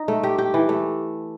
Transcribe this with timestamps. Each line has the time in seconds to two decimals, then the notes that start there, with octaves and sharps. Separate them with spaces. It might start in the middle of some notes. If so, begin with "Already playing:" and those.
Already playing: D#4
0.08 A3
0.23 G4
0.38 G4
0.54 E3
0.69 A3